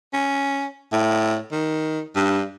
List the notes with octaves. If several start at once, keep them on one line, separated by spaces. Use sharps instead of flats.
C#4
A2
D#3
G2